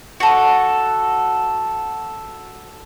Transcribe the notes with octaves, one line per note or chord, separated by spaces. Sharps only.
F#4 A4